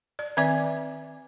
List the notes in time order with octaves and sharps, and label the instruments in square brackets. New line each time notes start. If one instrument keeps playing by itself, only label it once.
[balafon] D5
[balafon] D#3 C4 D6 [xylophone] D5 E5 G#6